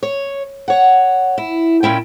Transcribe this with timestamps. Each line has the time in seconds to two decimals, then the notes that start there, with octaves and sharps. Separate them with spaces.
0.03 C#5
0.68 C#5 F#5
1.38 E4
1.83 A#2 C#4 E4 G5